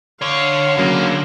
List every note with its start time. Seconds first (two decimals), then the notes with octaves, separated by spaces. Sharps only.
0.22 D3 C#5 F5
0.77 C#3 F#3 A#3